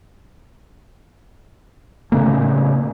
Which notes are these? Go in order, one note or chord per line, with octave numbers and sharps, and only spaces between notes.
A2 C#3 A3 A#3